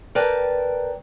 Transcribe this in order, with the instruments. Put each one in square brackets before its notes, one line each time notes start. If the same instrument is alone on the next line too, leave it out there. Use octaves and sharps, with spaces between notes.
[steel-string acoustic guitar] A#4 B4 D5 G5 A5